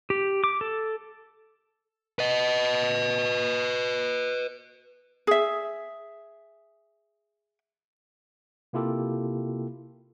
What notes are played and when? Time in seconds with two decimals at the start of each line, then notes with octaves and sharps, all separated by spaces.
0.10 G4
0.44 D6
0.61 A4
2.19 B4 D#5
5.27 G#4 E5
8.73 C3 A#3 E4 F4 G4 A4